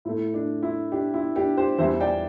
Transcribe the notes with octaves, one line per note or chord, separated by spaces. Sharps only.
A2 A3 E4
D4
E4
D4 G4
E4
D4 G4
G4 C5
E2 E3 G3 C5 E5
D5 G5